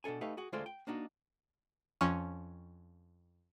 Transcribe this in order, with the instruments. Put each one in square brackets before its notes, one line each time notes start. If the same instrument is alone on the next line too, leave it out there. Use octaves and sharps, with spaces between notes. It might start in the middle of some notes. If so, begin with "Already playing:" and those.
[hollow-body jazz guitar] B2 D4 E4 A4 G#5
A3 D#4 G4 A4 B4 F5
F#4 G#4
D2 G#3 F4 A4 C5 D5
G5
A#3 D4 D#4 F#4
[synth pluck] F2 F3 C#4